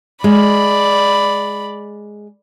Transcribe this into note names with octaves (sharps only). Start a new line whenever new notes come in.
G#3 D5 B5